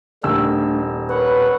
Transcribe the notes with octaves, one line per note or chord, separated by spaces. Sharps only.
D#1 D#3 A3 D4 E6
A#4 B4 C#5 F#5